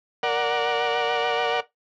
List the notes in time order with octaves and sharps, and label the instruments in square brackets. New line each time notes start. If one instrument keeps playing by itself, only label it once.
[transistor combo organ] A#4 D5 F#5